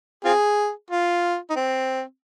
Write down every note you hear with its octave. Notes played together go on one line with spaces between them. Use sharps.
C4 F4 G#4
F4
D#4
C4